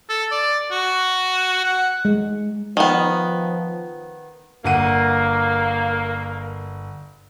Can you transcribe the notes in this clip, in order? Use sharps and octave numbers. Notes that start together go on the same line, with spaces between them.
A4
D5
F#4
F#5
G#3
D#3 F3 B3
G1 A#3 F#5 D#7